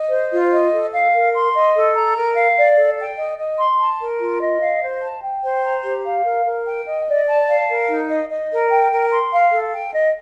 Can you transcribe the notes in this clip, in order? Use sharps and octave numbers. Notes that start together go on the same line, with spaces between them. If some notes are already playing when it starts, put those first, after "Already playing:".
Already playing: D#5
C5
F4
D#5
A4
F5
A#4
C6
D#5
A4
A#5
A#4
F5
D5
A4
G5
D#5
D#5
C6
A5
A#4
F4
D#5
F5
C5
A5
G5
C5
A#5
G4
F5
A#4
A#4
G5
D#5
D5
A5
F5
A#4
D#4
D#5
D#5
A#4
G5
A#4
C6
F5
A4
G5
D#5